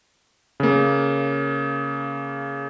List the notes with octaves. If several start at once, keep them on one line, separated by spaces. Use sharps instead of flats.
C#3 A#3